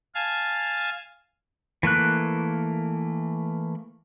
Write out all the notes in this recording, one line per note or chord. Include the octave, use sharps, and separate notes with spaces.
F5 G#5 A5
E3 A3 A#3 F#6